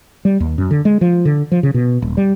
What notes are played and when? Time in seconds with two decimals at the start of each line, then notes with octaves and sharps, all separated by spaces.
0.25 G3
0.40 D#2
0.58 F#2
0.71 D3
0.85 G#3
1.01 F3
1.25 D3
1.52 F3
1.63 C#3
1.74 B2
2.02 D#1
2.17 G3